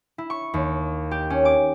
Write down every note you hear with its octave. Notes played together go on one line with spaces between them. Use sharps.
E4
C#6
D#2
G4
C#4
D6